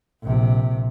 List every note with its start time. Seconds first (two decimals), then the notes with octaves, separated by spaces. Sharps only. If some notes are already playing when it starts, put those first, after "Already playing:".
0.22 A#1 C3